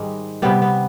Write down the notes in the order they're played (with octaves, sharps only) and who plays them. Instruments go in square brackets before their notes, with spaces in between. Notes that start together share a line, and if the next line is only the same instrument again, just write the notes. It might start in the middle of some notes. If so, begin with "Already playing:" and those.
Already playing: [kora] G#2 D#3 G3 G#3
C3 G3 B3
B3